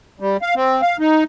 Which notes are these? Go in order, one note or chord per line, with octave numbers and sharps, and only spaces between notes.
G3
F5
C4
F5
D#4